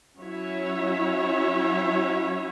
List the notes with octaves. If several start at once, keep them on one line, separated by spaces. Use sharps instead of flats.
F#3 C#4 E4 C#5 E5